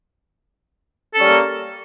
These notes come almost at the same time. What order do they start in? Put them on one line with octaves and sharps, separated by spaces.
A4 C#4 G3 A#4 A#3